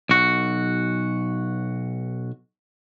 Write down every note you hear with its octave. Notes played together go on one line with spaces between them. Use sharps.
B1 F#4